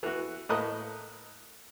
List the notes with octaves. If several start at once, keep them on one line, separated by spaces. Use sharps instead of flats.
E3 F#4
A2 A#3 B4 D#5 D#6 F#6